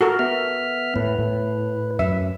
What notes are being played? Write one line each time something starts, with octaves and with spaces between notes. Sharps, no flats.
F#4 A4 A#4
B3 E5 F6
A2 B4
A2
F#2 E5